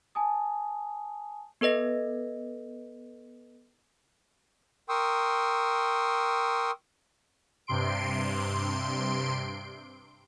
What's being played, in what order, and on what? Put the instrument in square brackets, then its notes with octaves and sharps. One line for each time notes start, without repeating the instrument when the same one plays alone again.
[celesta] G#5 A5 D#6
[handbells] B3 A4 B4 D#5 A#6
[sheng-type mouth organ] A#4 G5 C6 C#6 D#6 E6
[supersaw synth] G2 C3 C6 D7